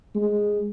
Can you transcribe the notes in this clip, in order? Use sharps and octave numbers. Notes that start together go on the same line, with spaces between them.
G#3